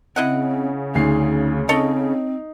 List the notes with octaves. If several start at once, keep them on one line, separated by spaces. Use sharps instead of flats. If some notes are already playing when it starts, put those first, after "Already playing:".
C#3 C4 E4 D#5 F#5
D2 D#4 G#4 C7
C4 D#4 A4 C#5 D#5